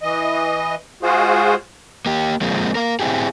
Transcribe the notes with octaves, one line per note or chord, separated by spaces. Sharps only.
E3 D#5
G#3 F4 F#4 G#4 C5
A#3 G4
F3 G#3 A#3 C4
A#3 A#4
C4 E4 G4 G#4